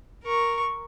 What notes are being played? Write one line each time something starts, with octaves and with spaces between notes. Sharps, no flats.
A#4 C#6